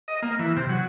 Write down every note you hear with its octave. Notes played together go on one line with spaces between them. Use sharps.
D#5
A#3
E3
C3
F#3